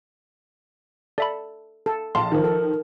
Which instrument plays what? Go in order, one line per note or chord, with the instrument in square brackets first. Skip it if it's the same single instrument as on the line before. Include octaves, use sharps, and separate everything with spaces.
[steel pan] A4 [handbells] D5 E5 B5
[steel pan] A4
[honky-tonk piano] A#1 F5 A5 [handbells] C6
[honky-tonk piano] D#3 F3 [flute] A#4
[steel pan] A4